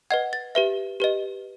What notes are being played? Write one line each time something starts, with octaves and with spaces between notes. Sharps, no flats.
B4 D#5 F#5 G#6
A6
G4 B4 E5
G4 B4 D#5